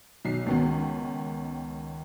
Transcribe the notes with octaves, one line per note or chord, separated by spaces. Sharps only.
B1 C7
C#2 D#3 B3